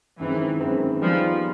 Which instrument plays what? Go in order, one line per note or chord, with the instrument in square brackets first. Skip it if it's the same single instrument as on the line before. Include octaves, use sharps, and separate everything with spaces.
[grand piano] F#2 D#3 G#3 C4 E4 [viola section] E3
[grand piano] F#2 D#3 G#3 C4 E4
[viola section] F3 [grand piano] G3 B3 D#4 G#4